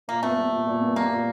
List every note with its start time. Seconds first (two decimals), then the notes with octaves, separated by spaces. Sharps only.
0.08 A#2 A#3
0.23 A3 B3
0.38 G3
0.52 A#2
0.67 A#2
0.81 B3
0.96 G3 A#3
1.11 A#2